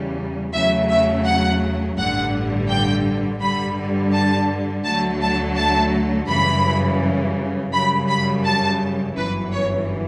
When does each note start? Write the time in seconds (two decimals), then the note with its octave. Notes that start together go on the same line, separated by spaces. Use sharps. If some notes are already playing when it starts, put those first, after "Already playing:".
Already playing: E2 C#3 G3
0.53 E2 C#3 F#3 A3 E5
0.89 E5
1.25 F#5
1.97 A1 G2 D3 G3 F#5
2.69 G5
3.40 G2 D3 G3 B5
4.13 A5
4.84 D2 D3 F#3 A3 A5
5.21 A5
5.56 A5
6.28 F#2 C#3 E3 G3 B5
7.72 F#2 C#3 G3 B5
8.09 B5
8.44 A5
9.16 G1 F#2 E3 B4
9.52 C#5